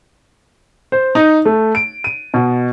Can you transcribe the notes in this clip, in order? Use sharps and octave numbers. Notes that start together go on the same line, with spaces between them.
C5
D#4
A3
D7
D#7
B2